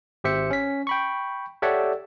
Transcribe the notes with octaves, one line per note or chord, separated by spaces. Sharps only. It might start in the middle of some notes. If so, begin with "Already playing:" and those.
G#1 G4 C5 E5 C#7
C#4 B6
G5 B5 C#6
G4 A4 C#5 D5 E5 F#5